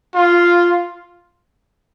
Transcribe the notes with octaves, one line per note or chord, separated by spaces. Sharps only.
F4